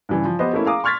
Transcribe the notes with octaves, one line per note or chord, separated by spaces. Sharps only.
G2 C#3 E3
F3
B3 G4 B4 C5 D#5
A3 A#3 C#4 E4
G#4 F5 G#5 A#5 D6 D#6
C6 C#6 F6 G#6 A6 B6